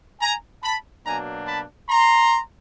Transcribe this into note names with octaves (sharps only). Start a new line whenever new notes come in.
G#5 A#5
A5 B5
B2 F#3 A#3 D4 G#5 A#5
A5 B5
A#5 C6